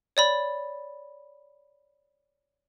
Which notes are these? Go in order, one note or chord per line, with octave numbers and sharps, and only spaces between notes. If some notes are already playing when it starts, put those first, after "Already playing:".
C#5 D5 B5